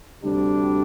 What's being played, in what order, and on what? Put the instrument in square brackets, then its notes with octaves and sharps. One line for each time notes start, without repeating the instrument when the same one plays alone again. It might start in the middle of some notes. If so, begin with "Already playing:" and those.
[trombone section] D2 C3 G3 D4 G4